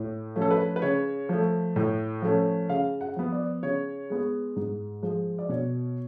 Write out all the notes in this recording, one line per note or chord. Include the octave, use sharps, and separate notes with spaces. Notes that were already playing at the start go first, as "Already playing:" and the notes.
Already playing: A2
F3 A3 C#4
A4
B4
B4
C#3 C#5
F3 A3
A2
F3 A3 C#4
C#3 F5
F#5
F3 B3
D5
C#3 C#5
G#3 B3
G#2
F3 G#3
D5
B2 C#5